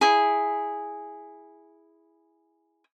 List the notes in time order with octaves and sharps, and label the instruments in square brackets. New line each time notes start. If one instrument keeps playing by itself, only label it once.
[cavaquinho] E4 G#4